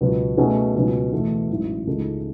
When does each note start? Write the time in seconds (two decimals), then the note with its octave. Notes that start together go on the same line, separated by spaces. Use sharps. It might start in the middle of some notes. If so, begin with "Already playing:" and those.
0.01 C#2 B2 F#3 B3 F#4
0.37 B2 A3 C#4 G#4
0.75 C#2 B2 F#3 C#4
1.12 E2 B2 A3
1.50 A1 G#2 F#3
1.87 C#2 C#3 G#3 D#4 A4